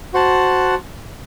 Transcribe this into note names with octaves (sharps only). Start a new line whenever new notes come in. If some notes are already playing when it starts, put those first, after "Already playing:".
F#4 C5 F#5 A5